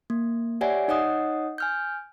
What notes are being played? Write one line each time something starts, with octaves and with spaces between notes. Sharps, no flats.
A#3
G4 C#5 D5 E5 F#5 G#5
D#4 C#5 D#5 F#5 D#6
G#5 F6 G6